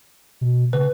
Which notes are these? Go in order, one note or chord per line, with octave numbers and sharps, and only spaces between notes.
B2
C#3 B4